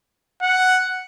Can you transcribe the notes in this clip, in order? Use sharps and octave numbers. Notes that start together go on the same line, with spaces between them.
F#5